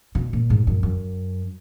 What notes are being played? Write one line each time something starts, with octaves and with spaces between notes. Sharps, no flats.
B2
A#2
G#2
F#2
F#2